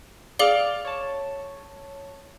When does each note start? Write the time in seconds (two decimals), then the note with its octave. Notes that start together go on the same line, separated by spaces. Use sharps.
0.39 G#4 D5 F5 D6 F6 G7
0.85 C#5 A5